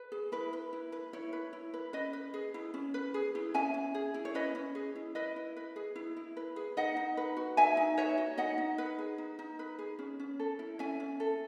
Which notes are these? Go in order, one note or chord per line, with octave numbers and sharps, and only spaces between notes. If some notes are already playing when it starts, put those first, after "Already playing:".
Already playing: B4
G#4
E4 B4
B4
E4
B4
E4 C#5
B4
E4
B4
C#4 B4 D#5
B4
G#4
E4
C#4
B4
G#4
E4
C#4 E5 G#5
C#4
G#4
E4
C#5
C#4 B4 D#5
C#4
G#4
E4
E4 B4 D#5
E4
B4
G#4
E4
E4
B4
G#4
D#4 D#5 F#5
D#4
B4
F#4
D#4 E5 G#5
D#4
B4 C#5 E5
F#4
D#4 D#5 F#5
D#4
B4
G#4
D#4
D#4
B4
G#4
C#4
C#4
A4
E4
C#4 E5 G#5
C#4
A4